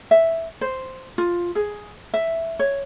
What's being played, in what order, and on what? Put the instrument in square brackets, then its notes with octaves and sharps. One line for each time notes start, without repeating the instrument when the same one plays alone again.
[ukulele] E5
C5
F4
G#4
E5
C#5